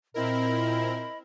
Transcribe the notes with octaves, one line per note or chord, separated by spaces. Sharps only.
A#2 C4 E4 A#4 D#5 B5